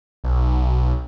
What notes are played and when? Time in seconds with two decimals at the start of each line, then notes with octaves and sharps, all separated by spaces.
0.24 B1